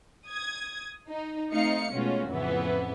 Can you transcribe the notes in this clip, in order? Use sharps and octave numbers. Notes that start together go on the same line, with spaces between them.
D#6 G#6
D#4
A3 C4 D#4 F5 C#7
B2 G#3 A3 C#4 F4 F#4
F2 A2 C#3 E3 B3